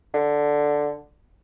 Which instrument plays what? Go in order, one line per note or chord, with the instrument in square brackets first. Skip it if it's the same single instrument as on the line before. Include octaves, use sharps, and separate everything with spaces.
[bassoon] D3